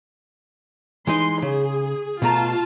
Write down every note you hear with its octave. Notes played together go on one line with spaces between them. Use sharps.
E3 G#3 D#4 C6
C#3 G#4
B2 A3 F4 A5 A#5